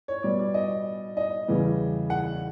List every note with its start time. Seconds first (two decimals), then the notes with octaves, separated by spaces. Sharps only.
0.08 C#5
0.23 B2 G3 B3 D5
0.39 D5
0.54 D#5
1.17 D#5
1.48 E2 C#3 E3 G3 B3
2.10 F#5